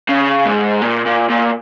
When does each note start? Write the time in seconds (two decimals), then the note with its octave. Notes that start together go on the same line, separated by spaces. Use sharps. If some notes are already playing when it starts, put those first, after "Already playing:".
0.09 C#3
0.45 G#2
0.82 A#2
1.05 A#2
1.29 A#2